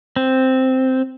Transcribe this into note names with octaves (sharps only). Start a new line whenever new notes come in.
C4